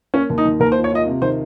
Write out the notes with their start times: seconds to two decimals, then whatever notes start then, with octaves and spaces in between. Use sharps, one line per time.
0.14 A#3 C#4
0.30 D#2
0.38 D#4
0.45 D#3
0.60 D#2 A#4
0.72 C5
0.76 F4
0.84 C#5
0.91 F4 D#5
1.07 C3
1.22 D#3 C5